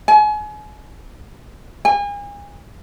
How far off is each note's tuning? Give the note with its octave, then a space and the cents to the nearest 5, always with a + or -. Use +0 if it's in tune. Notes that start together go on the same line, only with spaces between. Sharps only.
G#5 +35
G#5 -35